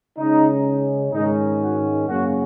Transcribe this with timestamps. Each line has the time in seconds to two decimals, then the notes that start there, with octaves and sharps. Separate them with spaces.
0.17 C#3 G#3 C#4 D#4
1.13 G#2 D#3 G#3 C#4 D#4
1.60 F#4
2.08 F#2 C#3 A#3 C#4 F#4